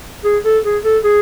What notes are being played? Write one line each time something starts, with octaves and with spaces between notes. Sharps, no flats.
G#4
A4
G#4
A4
G#4